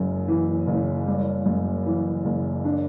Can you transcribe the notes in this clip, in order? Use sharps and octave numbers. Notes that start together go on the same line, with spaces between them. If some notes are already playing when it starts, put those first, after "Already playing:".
Already playing: F#1 F#2
E3
F#1
G3
F#2
E3
F#1
D4